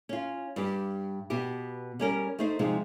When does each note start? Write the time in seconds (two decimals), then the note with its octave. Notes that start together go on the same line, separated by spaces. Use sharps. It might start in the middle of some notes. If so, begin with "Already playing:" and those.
0.09 C#4 F4
0.56 G2 G4
1.30 B2 B3 G4
1.99 G3 C#4 A#4
2.39 A3 D#4 C5
2.59 C3 F3 G#3 D#4